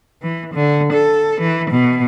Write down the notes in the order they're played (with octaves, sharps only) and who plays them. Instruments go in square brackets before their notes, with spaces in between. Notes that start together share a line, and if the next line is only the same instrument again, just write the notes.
[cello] E3
D3
A4
E3
B2